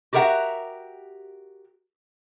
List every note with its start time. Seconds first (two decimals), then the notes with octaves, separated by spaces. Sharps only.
0.13 F#4 G4 A#4 E5 F#5